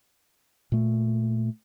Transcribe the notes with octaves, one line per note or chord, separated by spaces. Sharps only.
A#2 A3